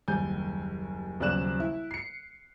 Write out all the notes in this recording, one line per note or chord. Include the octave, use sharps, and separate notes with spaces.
F#1 D#2 G3 G#5 G6
D#1 B1 C#3 D5 F#6 E7
E4
C7 C#7